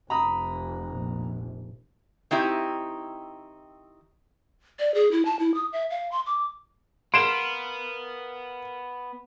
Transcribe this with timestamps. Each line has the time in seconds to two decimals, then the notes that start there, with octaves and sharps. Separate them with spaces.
0.10 F1 A#5 B5 D#6
0.90 A#1
2.31 D#3 C4 D#4 E4 G4
4.79 D5
4.94 G#4
5.12 E4
5.25 A5
5.40 E4
5.54 D#6
5.73 E5
5.90 F5
6.12 C6
6.26 D6
7.14 B3 A#4 F5 C6 D7 E7